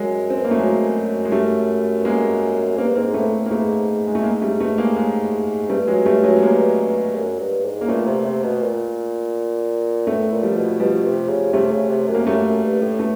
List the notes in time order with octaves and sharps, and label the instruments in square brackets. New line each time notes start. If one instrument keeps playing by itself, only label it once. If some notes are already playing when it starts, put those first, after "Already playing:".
Already playing: [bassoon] F#2 [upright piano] F#3 G#3
[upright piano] C4
B3
A#3
A3
F#3 G#3
G#3
G3 A3
B3
G#3 A#3
[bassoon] G2 [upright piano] A#3 C4
[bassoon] G#2 [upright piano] A#3 C4
[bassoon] A2 [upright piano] A3 B3
[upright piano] A#3
[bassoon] G#2 [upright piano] A3 B3
[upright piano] G#3
A3
G#3 A#3
G3 A3
A3 B3
G#3 A#3
G#3 A#3
[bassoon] G2 [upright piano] G3 A3
[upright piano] F#3 G#3
G3 A3
F#3 G#3
B3
G#3 A#3
[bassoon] F#2
G2
G#2
[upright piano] A#3
[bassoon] A#2 [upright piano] A3 B3
[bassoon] C3
C3
B2
A#2
[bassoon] A2 [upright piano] A3 B3
[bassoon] A#2
[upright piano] F3 G3
[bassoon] B2
[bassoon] B2 [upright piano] F3 G3
[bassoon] C3
C#3
[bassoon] C3 [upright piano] G3 A3
[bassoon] C#3
C3
F#2
[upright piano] A#3
[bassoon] F#2 [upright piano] G3 A3
[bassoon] F#2
G2
A2
[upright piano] A3 B3